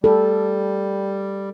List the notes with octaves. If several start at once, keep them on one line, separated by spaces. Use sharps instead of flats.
G3 A4